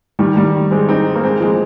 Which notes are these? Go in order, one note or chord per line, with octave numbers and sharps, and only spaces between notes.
D#3 G3
D#3 G3
G#3 C4
C4 D#4
A#3
G#3 C4
F3 G#3